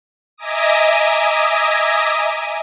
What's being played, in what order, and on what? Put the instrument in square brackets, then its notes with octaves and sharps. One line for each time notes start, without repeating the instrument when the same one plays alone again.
[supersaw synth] D#5 E5 G#5 A#5 D6 D#6